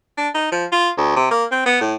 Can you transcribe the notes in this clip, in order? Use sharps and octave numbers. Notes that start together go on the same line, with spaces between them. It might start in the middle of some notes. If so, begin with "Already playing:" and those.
D4
D#4
F3
F4
D2
C3
A#3
C4
B3
A2